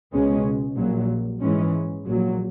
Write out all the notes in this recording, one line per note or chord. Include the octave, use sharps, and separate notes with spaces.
C#2 B2 G#3 C#4
A#1 A#2 F#3
G#2 E3 G#3 C#4
A#1 A#2 F#3